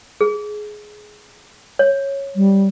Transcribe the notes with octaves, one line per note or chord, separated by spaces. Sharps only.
G#4
C#5
G3